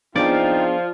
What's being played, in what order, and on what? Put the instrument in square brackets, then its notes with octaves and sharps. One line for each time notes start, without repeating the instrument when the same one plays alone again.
[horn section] F3 F4 [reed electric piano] B3 D4 G#4 [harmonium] C4 D#4 [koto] D5